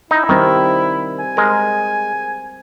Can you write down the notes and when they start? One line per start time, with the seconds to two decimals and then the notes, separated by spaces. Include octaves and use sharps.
0.11 D#4 E4
0.29 D#3 G3 C4 C5
1.19 G#5
1.37 G#3 A#4